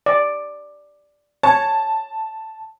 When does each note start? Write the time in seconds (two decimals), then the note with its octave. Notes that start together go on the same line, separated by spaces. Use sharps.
0.06 D5
1.43 C#5 A5